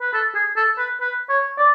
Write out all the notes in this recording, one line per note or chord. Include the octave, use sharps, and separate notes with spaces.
B4
A4
G#4
A4
B4
B4
C#5
D5